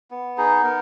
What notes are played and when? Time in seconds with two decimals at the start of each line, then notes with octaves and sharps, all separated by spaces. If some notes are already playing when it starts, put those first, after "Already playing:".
0.11 B3
0.38 D#4 G#4
0.64 B3 A#4